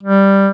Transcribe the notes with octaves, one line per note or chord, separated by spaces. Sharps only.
G3